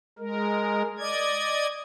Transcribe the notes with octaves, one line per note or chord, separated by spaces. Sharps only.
G#3 A#4
D5 D#5 G#6